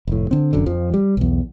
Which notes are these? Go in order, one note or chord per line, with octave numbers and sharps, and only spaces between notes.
F1 A2
D3 C4
F1 F#2 D3
F2 F3
G3
B1 E2